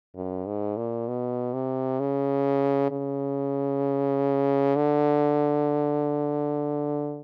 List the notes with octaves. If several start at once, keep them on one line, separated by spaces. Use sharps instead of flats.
F#2
G#2
A#2
B2
C3
C#3
C#3
D3